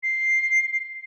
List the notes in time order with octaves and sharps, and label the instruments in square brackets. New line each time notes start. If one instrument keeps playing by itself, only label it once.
[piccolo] C7